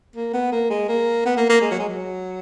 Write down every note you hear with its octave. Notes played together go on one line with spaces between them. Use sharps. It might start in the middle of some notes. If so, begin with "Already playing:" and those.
A#3
B3
A#3
G#3
A#3
B3
A#3
A#3
G#3
F#3
G#3
F#3